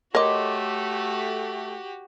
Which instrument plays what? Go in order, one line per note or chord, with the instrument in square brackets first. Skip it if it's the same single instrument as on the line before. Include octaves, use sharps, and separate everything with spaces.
[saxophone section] A3 [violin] F#4 G4 [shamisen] A#4 D#5 [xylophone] C#5 C6 D6